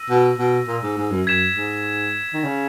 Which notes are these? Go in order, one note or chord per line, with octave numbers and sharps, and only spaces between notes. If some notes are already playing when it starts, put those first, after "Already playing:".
Already playing: E6 A#6 D#7
B2
B2
A#2
G#2
G#2
F#2
F#2 G#6 B6 E7
G#2
D#3
C#3